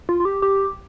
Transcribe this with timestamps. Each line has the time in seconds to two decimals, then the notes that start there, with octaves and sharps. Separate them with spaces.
0.09 F4
0.20 F4
0.25 G4
0.42 G4